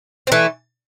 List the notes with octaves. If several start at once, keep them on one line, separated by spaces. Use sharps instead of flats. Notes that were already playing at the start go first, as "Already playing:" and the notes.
C4
E3 A3